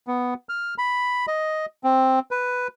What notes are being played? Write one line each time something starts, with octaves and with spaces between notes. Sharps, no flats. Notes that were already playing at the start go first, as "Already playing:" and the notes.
B3
F6
B5
D#5
C4
B4